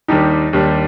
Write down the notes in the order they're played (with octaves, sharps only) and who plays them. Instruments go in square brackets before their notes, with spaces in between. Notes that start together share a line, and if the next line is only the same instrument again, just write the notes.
[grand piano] D#2 D#3 G3 D4 G4 [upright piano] D#4
[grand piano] D#2 D#3 G3 D4 G4